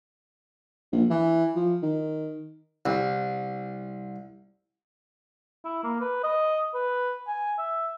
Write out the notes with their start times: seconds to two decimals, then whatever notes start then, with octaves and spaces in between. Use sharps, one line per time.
0.92 A#1
1.10 E3
1.55 F3
1.82 D#3
2.86 C2
5.65 E4
5.84 A#3
6.01 B4
6.23 D#5
6.74 B4
7.27 G#5
7.58 E5